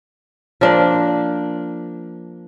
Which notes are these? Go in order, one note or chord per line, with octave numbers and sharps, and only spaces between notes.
F3 A#3 D4